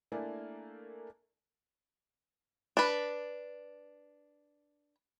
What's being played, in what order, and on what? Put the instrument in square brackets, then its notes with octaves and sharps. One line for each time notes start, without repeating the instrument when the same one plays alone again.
[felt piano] A3 A#3 D4 E4 D5 G#5
[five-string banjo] D4 B4